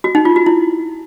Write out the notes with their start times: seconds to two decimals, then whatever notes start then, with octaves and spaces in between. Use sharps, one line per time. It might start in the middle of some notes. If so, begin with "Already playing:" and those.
0.04 F#4
0.15 D#4
0.25 F4
0.36 F#4
0.46 E4